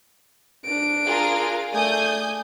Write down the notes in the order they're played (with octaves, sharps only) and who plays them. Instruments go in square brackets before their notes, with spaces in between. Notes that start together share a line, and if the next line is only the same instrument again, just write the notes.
[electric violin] D4 D7
[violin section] F4 G#4 A#4
[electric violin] A3 D5 [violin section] G#5 D#6 G6